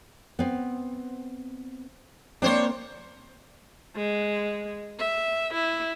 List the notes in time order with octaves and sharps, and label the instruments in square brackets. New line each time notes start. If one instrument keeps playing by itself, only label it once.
[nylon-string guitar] B3 C4
[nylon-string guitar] A#3 C4 [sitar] D4 C5 C#5
[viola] G#3
E5
E4